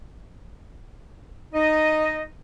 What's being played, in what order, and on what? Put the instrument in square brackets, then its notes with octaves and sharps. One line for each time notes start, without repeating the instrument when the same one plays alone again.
[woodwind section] D#4 D#5